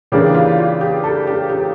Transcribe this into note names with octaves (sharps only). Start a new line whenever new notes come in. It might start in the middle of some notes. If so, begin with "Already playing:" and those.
C#3 E3 A#3 D4 G4
F4
F4
G4
A4
G4
G4